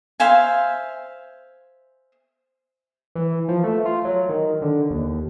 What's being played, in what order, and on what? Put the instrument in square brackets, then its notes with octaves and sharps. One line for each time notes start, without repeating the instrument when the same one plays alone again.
[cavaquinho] C5 E5 F5 G#5
[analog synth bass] E3
F3
A3
F4
F#3
D#3
D3
D#2